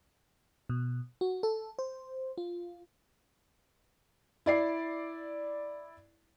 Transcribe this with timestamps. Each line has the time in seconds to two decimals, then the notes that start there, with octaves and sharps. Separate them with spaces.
0.70 B2
1.21 F#4
1.43 A4
1.79 C5
2.38 F4
4.46 E4 D5 C7